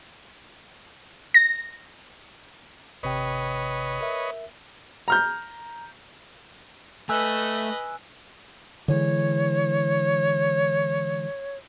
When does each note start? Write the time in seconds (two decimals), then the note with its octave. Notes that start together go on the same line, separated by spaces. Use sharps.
1.34 A#6
3.03 G#1 C3 B4 C#5 D#5 G5
4.01 A#4 E5
5.08 A#5 F6 G6
7.09 A3 B4 D#5 G#5 E6 F#6
8.88 D3 E3 G#3 C#5